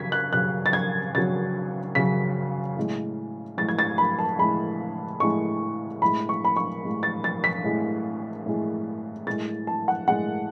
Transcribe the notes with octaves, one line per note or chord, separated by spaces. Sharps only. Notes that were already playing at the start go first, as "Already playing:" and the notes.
Already playing: C#3 F#3 G#6 B6
F#6
C#3 F#3 F#6
A6
G#6
C#3 F#3 A6
C#3 F#3 B6
A2 G#3
A2 G#3 A6
G#6
A6
B5
A5
A2 G#3 B5
A2 G#3 C#6
A2 G#3 B5
C#6
B5
C#6
A2 G#3
A6
A6
B6
A2 G#3
A2 G#3
A2 G#3 A6
A5
F#5
A2 G#3 F#5